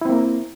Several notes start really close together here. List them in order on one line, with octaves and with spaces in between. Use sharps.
E4 C4 A#3 A#4